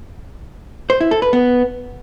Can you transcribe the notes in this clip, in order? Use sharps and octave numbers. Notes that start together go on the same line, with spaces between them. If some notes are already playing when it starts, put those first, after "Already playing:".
C5
E4
A4
B4
B3